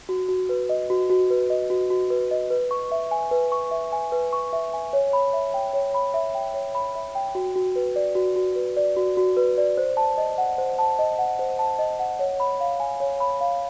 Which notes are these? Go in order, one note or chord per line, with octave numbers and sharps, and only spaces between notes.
F#4
F#4
B4
D#5
F#4
F#4
B4
D#5
F#4
F#4
B4
D#5
B4
C#6
E5
G#5
B4
C#6
E5
G#5
B4
C#6
E5
G#5
C#5
B5
E5
G5
C#5
B5
E5
G5
C#5
B5
E5
G5
F#4
F#4
B4
D5
F#4
F#4
B4
D5
F#4
F#4
B4
D5
C5
A5
D#5
F#5
C5
A5
D#5
F#5
C5
A5
D#5
F#5
C#5
B5
F5
G#5
C#5
B5
F5